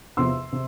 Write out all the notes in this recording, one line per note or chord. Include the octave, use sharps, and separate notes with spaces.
E2 C3 F3 C6 E6
C3